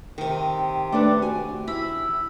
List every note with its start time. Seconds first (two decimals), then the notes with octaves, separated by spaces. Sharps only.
0.18 C3 D#3
0.92 A3 D4 B4 D6
1.22 F#4 G#5
1.67 E4 B5 E6